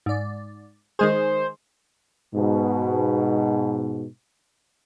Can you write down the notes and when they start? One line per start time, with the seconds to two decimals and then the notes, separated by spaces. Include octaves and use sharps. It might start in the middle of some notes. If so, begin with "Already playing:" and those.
0.06 G#2 D5
0.99 D#3 G#3 G#4 C5
2.34 G#2 B2